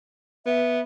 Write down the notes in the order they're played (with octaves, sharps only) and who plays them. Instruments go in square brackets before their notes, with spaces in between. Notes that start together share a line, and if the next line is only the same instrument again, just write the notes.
[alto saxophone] B3 [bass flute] E5